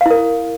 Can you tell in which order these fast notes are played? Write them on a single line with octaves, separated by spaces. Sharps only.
F5 E4 A#4